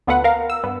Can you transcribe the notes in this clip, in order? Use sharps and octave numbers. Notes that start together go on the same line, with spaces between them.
D2 B3 F4 A4 B4 F#5
A#4 F5
E6
G2 B3